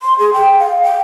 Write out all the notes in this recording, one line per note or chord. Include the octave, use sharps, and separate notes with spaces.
C6
G#4
G5
F5
G5